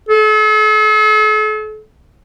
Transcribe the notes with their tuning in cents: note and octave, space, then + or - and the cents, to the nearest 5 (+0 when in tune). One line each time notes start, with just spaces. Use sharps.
A4 -45